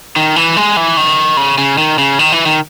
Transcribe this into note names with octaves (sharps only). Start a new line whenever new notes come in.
D#3
E3
G#3
E3
D#3
C#3
C#3
D#3
C#3
D#3
E3
D#3